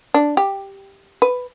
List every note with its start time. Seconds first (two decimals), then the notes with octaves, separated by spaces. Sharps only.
0.14 D4
0.37 G4
1.22 B4